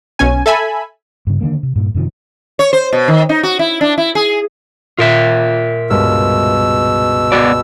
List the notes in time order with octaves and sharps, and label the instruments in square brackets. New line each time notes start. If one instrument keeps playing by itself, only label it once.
[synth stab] B1 B2 C#4 G#5
A4 E5 G#5 B5
[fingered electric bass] G2 C#3
D3 D#3 G#3 A#3
C3
G2 A#2 A#3
F#2 C3 D#3 F3
[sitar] C#5
C5
B2
D#3
D#4
F#4
E4
D4
E4
G#4
[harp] A#2 [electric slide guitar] F4 A#4 E5
[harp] C#2 G2 F6 [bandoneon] B2 E6
[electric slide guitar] B3 F#4 D5 [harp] G5 B5